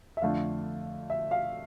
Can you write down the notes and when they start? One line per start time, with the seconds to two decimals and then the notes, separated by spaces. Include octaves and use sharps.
0.17 E5
0.22 F2 D3 A3 F5
1.10 E5
1.31 F5